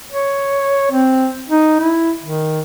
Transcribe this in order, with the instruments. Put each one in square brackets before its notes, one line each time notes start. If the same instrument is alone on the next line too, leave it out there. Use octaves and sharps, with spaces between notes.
[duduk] C#5
C4
D#4
E4
D#3